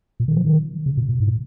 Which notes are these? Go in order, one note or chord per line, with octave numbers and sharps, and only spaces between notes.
A#2
D#3
F3
D#3
C#3
A#2
A#2
G#2